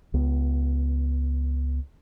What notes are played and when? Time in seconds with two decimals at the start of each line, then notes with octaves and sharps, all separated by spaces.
0.14 C#2 B3